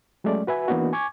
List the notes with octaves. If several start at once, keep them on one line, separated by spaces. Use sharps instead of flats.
F#3 G#3 A3 C#4 D5
F#4 B4 E5 G#5
E3 A#3 B3 D4 D#4 F#4
G#5 C#6 D6 G#6